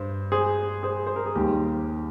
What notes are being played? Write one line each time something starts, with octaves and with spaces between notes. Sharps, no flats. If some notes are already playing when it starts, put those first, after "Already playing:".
Already playing: G2 C5
G#4 C5
G#4 C5
C5
A#4
G#4
D#2 D#3 G3 G4